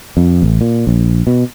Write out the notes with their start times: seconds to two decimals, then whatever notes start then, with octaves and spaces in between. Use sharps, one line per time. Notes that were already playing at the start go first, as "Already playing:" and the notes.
0.17 F2
0.43 A1
0.61 A#2
0.87 A#1
1.27 B2